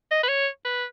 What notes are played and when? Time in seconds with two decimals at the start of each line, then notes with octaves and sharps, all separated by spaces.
0.11 D#5
0.23 B4
0.28 C#5
0.65 B4